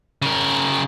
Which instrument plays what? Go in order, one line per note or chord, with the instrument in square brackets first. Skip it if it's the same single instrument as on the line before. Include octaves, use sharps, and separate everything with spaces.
[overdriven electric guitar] C#3 A#4